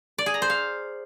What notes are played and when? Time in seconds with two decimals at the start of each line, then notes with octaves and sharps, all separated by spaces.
0.18 D5
0.26 G#4
0.34 A#5
0.42 C5
0.50 F5